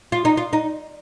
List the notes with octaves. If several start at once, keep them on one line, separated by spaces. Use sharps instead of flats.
F4
D#4
F4
D#4